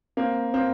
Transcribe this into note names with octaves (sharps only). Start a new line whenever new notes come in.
A#3 C4
A#3 C4